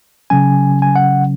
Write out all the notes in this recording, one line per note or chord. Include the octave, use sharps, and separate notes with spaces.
C#3 F#3 C#4 G#5
G#5
F#5